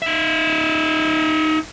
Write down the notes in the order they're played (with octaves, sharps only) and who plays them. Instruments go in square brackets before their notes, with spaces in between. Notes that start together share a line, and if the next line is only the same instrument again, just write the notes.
[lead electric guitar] D#4 E5